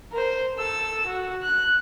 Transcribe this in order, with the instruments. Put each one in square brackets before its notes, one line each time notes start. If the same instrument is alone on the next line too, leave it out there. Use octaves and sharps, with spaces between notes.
[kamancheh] A#4 C5
A4 E6
F#4
F#6